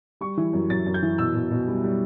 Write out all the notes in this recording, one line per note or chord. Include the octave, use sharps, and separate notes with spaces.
G3 C#6
E3
F#2
F#2 A6
F#2
G6
E3
B2 E6
B2
B2
G3
G3